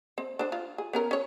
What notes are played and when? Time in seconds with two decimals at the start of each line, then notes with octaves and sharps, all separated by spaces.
0.18 C4
0.39 D4 C5
0.52 F4
0.78 G#4
0.93 B3 C#4 A#4
1.11 C#4 C#5